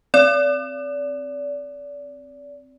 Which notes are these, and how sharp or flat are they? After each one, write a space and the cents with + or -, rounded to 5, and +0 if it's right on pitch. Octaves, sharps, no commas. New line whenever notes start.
C4 +0 D5 -30